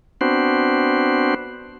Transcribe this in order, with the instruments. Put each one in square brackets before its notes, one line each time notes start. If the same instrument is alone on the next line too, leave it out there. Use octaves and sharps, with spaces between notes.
[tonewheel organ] B3 C4 D4 F#4 C5